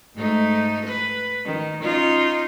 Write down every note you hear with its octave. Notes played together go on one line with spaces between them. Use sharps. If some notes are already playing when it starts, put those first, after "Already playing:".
G#2 A3 D#4
B4
D#3
C#4 D#4 F4